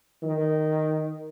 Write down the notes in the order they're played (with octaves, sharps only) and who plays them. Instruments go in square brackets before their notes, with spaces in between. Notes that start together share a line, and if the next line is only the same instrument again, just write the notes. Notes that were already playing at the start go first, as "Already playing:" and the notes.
[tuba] D#3